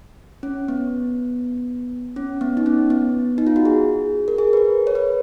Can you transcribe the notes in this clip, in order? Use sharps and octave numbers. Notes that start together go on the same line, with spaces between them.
C#4
B3
C#4
B3
D#4
C#4
B3
D#4
F4
F#4
G#4
A#4
G#4
B4
A#4
C#5
B4